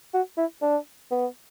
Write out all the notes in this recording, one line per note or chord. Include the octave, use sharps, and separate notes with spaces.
F#4
E4
D4
B3